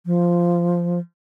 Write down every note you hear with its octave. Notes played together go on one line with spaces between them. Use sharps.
F3